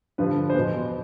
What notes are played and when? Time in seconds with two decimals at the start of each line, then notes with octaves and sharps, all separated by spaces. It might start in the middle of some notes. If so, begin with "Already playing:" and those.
0.18 G2 D3 F3 B4
0.50 C5
0.54 E2 B2 B4